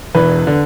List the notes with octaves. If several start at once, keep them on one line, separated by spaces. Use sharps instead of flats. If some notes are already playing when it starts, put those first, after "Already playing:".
E1 E2 E3 B4
D3